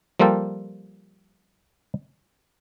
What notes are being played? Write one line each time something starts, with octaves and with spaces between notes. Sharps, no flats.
F3 G3 A#3 F4 A4 G5